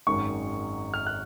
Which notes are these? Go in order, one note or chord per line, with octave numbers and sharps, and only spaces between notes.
G#1 F#2 D#3 G#3 C#6
F6
F#6